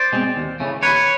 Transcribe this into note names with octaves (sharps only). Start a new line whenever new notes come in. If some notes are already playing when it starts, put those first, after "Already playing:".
Already playing: C5 D5
B2 G#3 C4
D#2
C#3 E3 A3
D#2 B4 C#5